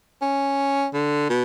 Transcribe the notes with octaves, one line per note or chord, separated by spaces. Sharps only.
C#4
D3
B2